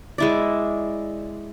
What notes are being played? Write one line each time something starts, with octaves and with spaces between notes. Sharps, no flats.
G#3 E4 D5